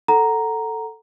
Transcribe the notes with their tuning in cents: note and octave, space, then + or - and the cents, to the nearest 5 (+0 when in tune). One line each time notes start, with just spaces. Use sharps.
A4 +5 F#5 +15 A#5 +0